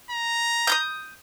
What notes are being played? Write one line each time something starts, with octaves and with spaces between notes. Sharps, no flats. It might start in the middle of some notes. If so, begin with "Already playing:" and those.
A#5
D#6 F6 G6